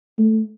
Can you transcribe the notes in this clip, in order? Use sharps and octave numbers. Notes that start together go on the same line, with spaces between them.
A3